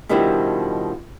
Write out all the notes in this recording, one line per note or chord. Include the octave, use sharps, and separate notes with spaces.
B2 D#3 F3 G3 D4 E4